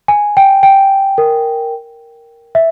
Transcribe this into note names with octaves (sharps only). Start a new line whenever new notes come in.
G#5
G5
G5
A#4
E5